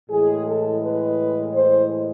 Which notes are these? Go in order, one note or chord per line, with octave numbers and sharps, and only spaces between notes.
A2 E3 G#3 G#4
A4
B4
C5